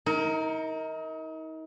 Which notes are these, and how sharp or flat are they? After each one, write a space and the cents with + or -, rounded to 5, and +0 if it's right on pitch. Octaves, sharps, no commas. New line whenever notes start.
D#4 +35 A#4 -5